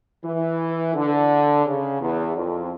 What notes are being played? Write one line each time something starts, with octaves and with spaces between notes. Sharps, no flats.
E3
D3
C#3
E2
F2